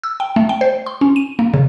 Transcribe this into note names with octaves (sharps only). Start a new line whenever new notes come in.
E6
G5
A3
G5
C5
C6
C#4
D#7
A#3
C#3